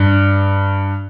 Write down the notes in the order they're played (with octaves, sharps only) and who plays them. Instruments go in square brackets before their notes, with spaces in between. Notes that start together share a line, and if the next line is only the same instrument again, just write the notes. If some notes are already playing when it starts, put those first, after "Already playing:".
Already playing: [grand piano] G2